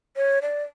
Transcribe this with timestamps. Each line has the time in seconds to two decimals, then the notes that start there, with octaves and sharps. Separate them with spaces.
0.17 C#5
0.42 D5